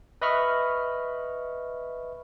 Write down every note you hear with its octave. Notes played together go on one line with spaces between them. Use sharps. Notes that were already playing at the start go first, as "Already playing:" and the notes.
B4 D#5 E5 B5 C#6 F6